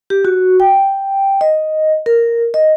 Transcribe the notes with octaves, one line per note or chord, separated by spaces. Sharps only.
G4
F#4
G5
D#5
A#4
D#5